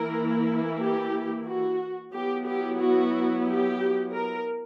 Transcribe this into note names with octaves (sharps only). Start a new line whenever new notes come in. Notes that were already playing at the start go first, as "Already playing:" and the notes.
Already playing: E3 A#3 E4 A#4
G4
F#4
F#3 B3 E4 G4
G4
F#4
G4
A#4